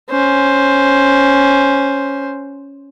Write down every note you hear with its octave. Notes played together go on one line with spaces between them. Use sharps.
C#4 C5